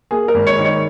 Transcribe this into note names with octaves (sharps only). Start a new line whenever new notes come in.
A#3 G#4
A#4
G#1
C#5
D#3
C#5